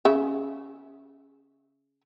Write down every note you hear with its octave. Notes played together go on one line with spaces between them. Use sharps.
C#3 E5